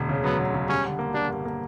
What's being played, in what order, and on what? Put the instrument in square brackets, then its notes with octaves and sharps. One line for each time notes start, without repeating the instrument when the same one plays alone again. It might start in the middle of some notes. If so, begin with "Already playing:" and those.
Already playing: [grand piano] E1 D2
C#3
[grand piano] F#3 [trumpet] B3
[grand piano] C#3
C#3
[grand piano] G3 [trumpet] C#4
[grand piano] D3
A#3
[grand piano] G3 [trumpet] D4
[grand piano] G2
A#3